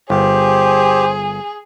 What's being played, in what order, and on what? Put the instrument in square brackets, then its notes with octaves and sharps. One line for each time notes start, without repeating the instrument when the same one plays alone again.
[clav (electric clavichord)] G1 [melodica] G4 [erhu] G#4 [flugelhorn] C5